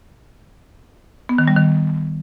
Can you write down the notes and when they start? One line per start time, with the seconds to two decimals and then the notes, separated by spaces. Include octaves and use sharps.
1.29 B3
1.38 D#3
1.48 G3
1.57 D#3